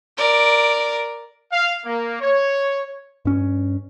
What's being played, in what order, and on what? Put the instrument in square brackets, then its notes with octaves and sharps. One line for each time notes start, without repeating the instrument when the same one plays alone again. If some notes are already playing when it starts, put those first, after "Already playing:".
[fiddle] A#4 D5
[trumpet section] F5
A#3
C#5
[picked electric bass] G2 C#4